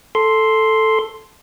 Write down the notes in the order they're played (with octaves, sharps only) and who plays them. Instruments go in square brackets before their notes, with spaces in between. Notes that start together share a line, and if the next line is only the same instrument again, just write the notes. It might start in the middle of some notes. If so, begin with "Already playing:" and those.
[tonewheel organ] A4 C6